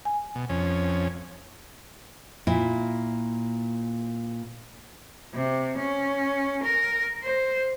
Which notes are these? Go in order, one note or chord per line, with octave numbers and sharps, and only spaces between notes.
G#5
B2
F2 C#4
A#2 E4
C3
C#4
A#4
C5